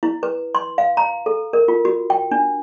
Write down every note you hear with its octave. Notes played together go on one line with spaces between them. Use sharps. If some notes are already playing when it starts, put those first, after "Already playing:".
E4
B4
C6
F5
A#5
A4
A#4
F4
F#4
G5
D4